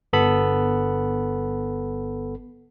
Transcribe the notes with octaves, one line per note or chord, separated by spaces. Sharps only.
G1 B3 A4 B5